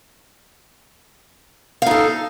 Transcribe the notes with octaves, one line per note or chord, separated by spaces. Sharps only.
D#4 A4 F5